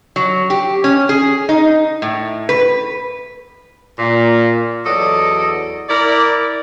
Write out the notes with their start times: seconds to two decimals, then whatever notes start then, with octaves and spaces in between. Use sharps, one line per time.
0.16 F#3
0.50 G4
0.84 C#4
1.09 G#4
1.49 D#4
2.02 A2
2.49 B4
3.98 A#2
4.85 E2 F#3 A4 D5 D#5
5.89 E4 A#4 D5